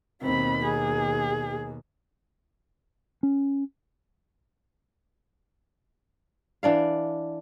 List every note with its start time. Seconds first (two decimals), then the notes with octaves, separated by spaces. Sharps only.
0.22 D#2 B2 C4 B5
0.64 G#4
3.23 C#4
6.63 E3 D4 D5 F5